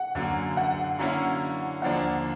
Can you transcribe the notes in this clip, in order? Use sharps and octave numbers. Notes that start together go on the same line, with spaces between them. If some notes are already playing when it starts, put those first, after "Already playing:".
Already playing: F#5
F#2 D3 F#3 A#3
F#5
D3 F#3 A#3 C#4 E4
D#2 D3 F3 A#3 D4 F#5